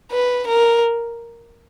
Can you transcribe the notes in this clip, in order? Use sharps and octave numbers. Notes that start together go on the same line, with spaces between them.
B4
A#4